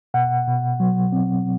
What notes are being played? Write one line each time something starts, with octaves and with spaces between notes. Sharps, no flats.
B2 F#5
B2
F#3
C4